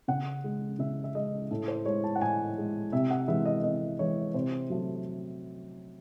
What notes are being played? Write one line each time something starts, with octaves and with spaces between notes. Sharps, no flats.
C#3 F#5
G#3
C#3 E5
E5
G#3 D#5
A2 A4
C5
G#3 C#5
A5
F#5
A2 G#5
G#3
C3 E5
F#5
E3 G#3 E5
D#5
C3 D#5
E3 G#3 C#5
C3 C5
F#3 A3